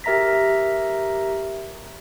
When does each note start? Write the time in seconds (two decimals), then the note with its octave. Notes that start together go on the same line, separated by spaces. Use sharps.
0.04 G4 A#4 E5 A#5 A#6 B6